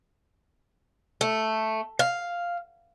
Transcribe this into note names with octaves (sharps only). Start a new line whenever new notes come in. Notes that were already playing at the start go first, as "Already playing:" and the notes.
A3
F5